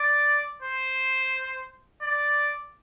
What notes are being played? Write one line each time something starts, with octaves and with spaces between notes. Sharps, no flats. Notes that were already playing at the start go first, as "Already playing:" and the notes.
Already playing: D5
C5
D5